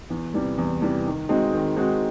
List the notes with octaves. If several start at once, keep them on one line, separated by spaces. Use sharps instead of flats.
E2
C3 E3 G3
E2
C3 E3 G3
D#3
G#3 C4 D#4 F#4
D#3
G#3 C4 D#4 F#4